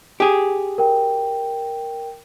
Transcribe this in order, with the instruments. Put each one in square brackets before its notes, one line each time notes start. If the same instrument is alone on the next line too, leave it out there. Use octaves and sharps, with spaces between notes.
[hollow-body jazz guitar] G4 G#4
[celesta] A#4 G5